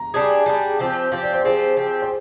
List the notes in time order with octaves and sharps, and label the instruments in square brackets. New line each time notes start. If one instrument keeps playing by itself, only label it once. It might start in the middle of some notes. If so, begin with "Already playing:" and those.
Already playing: [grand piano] A#5
[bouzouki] G3 D4 G#4
[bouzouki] G3 D4 G#4 [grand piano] G#5
[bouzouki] F3 C4 G4
[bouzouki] F3 C4 G4 [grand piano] F5
[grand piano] D5
C5
[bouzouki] F3 C4 G4 [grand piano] G#4
[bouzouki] F3 C4 G4
[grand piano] C5